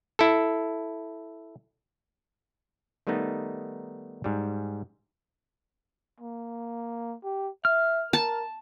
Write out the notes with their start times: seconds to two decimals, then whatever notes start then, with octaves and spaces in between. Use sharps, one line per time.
0.19 E4 A4
3.07 D#3 G3 A3 B3 D#4
4.24 G#2 G3
6.20 A#3
7.24 G4
7.65 E5 F6
8.13 A#4 A5